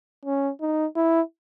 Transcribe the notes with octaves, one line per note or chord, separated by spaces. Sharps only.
C#4
D#4
E4